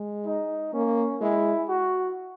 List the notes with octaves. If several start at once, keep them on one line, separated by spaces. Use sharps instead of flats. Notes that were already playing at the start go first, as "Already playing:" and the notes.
Already playing: G#3
D#4
A#3 C#4
G#3 E4
F#4